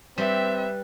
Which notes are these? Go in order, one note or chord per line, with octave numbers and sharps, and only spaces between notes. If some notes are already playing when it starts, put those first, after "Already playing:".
G3 C4 B4 E5